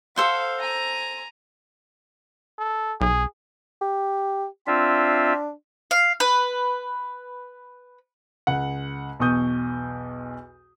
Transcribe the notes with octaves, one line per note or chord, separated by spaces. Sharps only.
A4 C5 F5 F#5
G#5 A#5
A4
B1 G#4
G4
C4 D4 F4 E5
F5
B4
C#2 F#5
B1 E2 C#6 D#6 G6